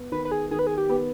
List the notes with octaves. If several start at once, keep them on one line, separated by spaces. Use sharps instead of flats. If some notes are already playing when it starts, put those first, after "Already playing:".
Already playing: B3
D#3 B4
B4
G#4
D#3 G#4
B4
G#4
G4
B3